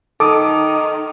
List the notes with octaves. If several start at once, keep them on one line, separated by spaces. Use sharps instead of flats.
D#3 D#4 A4 D6 D#6